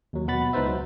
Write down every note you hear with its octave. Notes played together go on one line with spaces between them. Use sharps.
D#2 F#3
B2 F#5 B5 A6
C#2 D#4 B4 C5 E5
F#3